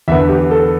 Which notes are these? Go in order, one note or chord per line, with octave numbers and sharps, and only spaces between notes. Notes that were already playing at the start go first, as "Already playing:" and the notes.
E2 D3 B3 E5
G4
A4